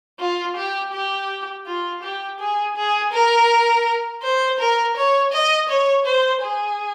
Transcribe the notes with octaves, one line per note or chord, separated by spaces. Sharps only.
F4
G4
G4
F4
G4
G#4
G#4
A#4
C5
A#4
C#5
D#5
C#5
C5
G#4